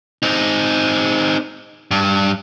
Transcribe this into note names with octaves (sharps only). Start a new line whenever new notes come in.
C4 D#4
G2